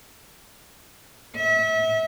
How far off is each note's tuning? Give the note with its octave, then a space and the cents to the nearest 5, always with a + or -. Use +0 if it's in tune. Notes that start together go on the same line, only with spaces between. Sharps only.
E5 -35